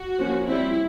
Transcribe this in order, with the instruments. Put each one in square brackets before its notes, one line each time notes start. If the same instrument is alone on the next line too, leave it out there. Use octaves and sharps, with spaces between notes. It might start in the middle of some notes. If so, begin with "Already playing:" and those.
Already playing: [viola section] F#4
F3 A#3 C#4
G3 C4 E4